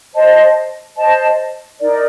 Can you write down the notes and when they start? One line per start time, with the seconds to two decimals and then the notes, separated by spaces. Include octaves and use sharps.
0.14 C5 D#5 A5
0.97 C5 D#5 A5
1.80 D#4 A#4 D5